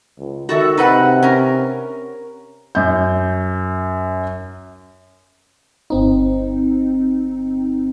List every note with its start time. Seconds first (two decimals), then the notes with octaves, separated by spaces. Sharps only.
0.19 C#2
0.49 D#3 F#4 A4 E5
0.77 C3 D#4 B4 F#5
1.23 C#4 A#4
2.75 F#2 G6
5.90 G1 C4 D#4